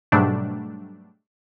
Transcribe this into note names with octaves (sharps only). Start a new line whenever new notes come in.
G#2 B2 F#3 G3 A3 D4